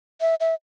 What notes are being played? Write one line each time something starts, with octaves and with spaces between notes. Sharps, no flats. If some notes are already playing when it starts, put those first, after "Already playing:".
E5
E5